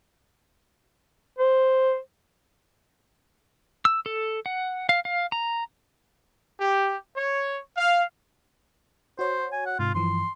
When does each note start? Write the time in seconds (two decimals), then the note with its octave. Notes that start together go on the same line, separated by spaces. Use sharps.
1.39 C5
3.85 E6
4.06 A4
4.46 F#5
4.89 F5
5.05 F5
5.32 A#5
6.60 G4
7.15 C#5
7.77 F5
9.19 F#4 C5 C#5
9.52 G#5
9.66 F#5
9.79 G#2 C3 F4
9.95 G2 E3 F3 C6